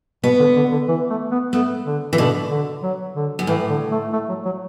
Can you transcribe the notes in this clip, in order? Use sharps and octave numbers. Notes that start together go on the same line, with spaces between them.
B2 B3
D3
D3
D3
E3
A3
B3
A3 B3
D3
E3
B2 D3
D3
F#3
D3
F#2
A2 E3
D3
A3
A3
F#3
F#3